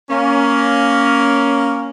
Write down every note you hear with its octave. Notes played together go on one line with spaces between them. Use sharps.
A#3 C#4